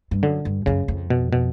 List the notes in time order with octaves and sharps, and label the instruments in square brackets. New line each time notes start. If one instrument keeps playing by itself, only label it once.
[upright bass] G2
[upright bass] F#2 [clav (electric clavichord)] D3
[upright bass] G2
[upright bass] F#2 [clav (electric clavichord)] C#3
[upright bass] F2
[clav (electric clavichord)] B2
B2